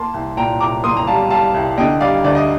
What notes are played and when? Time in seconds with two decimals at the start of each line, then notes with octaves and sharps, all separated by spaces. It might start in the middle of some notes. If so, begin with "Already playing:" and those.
Already playing: A#3 A5 C6
0.14 C2
0.37 A#2 G5 A#5
0.60 C2 A#5 D6
0.84 A#3 C6 D#6
0.97 A#5
1.07 G3 F5 A5
1.30 G3 F5 A5
1.54 C2
1.78 D3 D#5 G5
2.01 G3 D5 F5
2.24 D2 D5
2.35 D#5